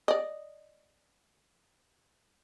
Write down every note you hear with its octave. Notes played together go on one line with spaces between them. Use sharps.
D5 D#5